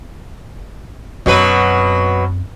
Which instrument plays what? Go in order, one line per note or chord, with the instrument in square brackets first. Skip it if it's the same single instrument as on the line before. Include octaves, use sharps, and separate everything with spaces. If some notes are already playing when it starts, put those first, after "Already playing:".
[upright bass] F#2 C4 [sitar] B2 F#3 B4